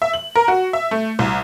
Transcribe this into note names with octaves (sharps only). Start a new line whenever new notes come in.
E5
F#7
A#4
F#4
E5
A3
C2